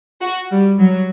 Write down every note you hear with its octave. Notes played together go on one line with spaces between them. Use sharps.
F#4
G3
F#3